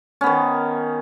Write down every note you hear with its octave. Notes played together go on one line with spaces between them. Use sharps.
D#3 B3 C#4